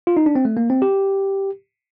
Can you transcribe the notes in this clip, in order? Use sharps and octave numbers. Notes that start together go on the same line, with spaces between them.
F4
D#4
D4
C4
A3
A#3
C4
G4